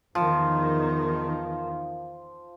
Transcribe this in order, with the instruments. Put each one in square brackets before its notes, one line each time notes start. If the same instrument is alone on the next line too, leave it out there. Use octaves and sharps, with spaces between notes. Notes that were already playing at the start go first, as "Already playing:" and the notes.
[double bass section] E2 D#3 [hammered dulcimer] F3